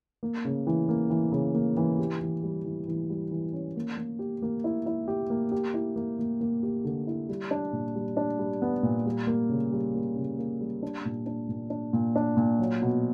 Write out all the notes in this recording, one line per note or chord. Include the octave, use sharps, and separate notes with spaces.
A#3
C#3
E3
A#3
E3
C#3
A#3
E3
G4
E3
G3
E3
E3
G3
E3
C#4
A#3
A#3
G4
A#3
E4
E4
G4
A#3
G4
E4
A#3
A#3
A#3
G4
D3
E4
G3
D4
A#2
G3
D4
G3
B3
A#2
G3
A#3
C#3
G3
A#3
C#3
A#3
G3
D4
A#2
D4
A#2
D4
A#2
D4
A#2
F#3
B2